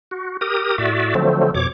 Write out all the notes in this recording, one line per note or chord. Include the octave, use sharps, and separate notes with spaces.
F#4
G4 A#4 D#6
A2 F#4 D5 E5
D3 F3 F#3 A3 C4
F2 B2 C#5 D6